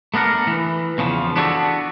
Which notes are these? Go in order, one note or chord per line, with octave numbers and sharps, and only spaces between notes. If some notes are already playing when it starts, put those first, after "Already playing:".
A3 B3 D4 A#4 F#5
E3
E2 C#3 F3
B3 D4 F#4 G4 A4